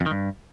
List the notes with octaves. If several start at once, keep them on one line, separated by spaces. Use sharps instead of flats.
F2
D#3
G2